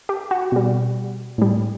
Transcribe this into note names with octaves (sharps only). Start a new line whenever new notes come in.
G4
F#4
B2 G3
A2 G3